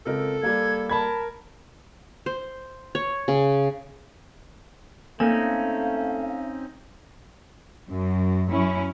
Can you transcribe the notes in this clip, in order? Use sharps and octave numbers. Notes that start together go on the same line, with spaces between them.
C#2 C4 A4 A#4
G3 A#3 G#6
A#4 A5 B5 G#6
C5
C#5
C#3
A3 A#3 C4 C#4 D#4 A4 F5 G#5
F#2
F#2 C#4 E4